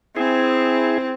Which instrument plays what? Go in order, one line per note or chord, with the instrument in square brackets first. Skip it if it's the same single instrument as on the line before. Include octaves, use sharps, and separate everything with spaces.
[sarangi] C4 [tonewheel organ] E4 G#4